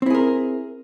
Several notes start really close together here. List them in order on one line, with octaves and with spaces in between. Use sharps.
C4 E4 G#4 A#4